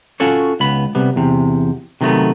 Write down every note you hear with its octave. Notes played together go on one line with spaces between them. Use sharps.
C#4 F4 F#4 A4 C#5
C#2 B3 B5
C3 G3 B3
E2 C3
C3 D#3 F#3 G3 A3 B3